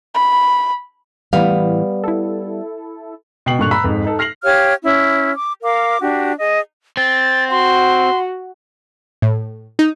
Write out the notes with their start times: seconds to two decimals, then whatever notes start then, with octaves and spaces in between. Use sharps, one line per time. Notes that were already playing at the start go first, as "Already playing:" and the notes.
0.14 B5
1.33 A2 E3 G3 B3 E4 F5
2.04 E4 A4
3.46 B2 G5 C7 F#7
3.59 G2 A#2 D3 C#6 F#6 F7
3.71 A#5 B5 E6 F#6 B6
3.84 F2 G#2
4.05 D#4 A4
4.19 F6 A#6 C7 F7 F#7
4.43 G4 C#5 F5 F6
4.83 C#4 E4
5.35 D6
5.62 A#4 F5 D6
6.02 D4 F#4 G4
6.39 G#4 D#5
6.97 C4 A6
7.51 F#4 C6
9.22 A2
9.79 D#4